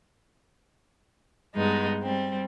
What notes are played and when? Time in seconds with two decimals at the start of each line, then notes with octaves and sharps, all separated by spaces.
1.54 G2 G#3 B3 D#4
2.02 G3 C4